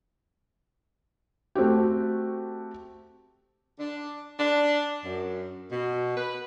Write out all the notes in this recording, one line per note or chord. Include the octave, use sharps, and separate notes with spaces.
A3 C4 F#4 G4
D4
D4
F#2
B2
B4